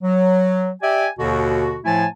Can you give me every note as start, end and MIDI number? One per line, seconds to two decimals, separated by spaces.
0.03 0.71 54
0.82 1.07 67
0.82 1.07 74
0.82 1.07 76
0.82 1.07 80
1.19 1.78 39
1.19 1.78 47
1.19 1.78 50
1.19 1.78 66
1.85 2.06 45
1.85 2.06 53
1.85 2.06 57
1.85 2.06 64
1.85 2.06 80
1.85 2.06 81